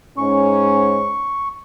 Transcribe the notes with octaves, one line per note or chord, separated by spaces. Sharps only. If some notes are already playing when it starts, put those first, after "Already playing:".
G#2 C#4 C#6